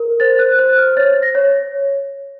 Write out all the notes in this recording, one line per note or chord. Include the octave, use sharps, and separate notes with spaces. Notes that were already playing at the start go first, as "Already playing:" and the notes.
Already playing: A#4
C5 A6
F#6
C5 F#6
F6
C#5 A6
A#6
C#5